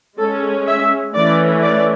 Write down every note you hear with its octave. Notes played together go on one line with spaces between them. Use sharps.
G#3 C#4 A4
E5
E3 A3 C#4 D5
D5